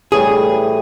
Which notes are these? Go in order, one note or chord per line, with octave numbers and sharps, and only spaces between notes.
A2 E3 G3 G#4